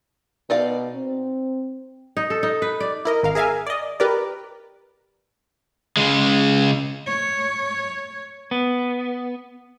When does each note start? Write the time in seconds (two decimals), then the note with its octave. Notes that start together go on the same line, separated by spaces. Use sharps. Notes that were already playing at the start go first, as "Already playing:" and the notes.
0.50 B2 D#4 D5 F5
0.96 C4
2.17 D#4
2.30 A4
2.43 D#4
2.62 B4
2.80 D5
3.05 E4 A#4 D#5
3.23 G#1 A#4 F5
3.35 G#4 A#4 E5 F5 G#5
3.66 D5 D#5
4.00 G4 A#4 B4 D5
5.97 C#3 G#3
7.06 C#5
8.51 B3